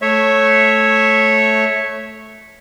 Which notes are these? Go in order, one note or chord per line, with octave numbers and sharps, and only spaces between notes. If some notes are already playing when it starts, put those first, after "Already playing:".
A3 C#5 E5